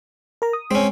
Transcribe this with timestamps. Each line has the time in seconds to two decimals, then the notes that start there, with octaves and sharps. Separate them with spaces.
0.42 A#4 A#5
0.53 D#6
0.71 G#3 C4 C#4